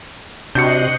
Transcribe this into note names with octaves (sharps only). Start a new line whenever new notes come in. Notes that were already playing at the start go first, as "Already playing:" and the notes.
C3 D4 F#4 D#5 F#6 G6 C7 C#7